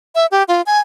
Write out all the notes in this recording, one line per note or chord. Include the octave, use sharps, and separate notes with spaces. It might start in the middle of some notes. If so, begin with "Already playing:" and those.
E5
G4
F4
G#5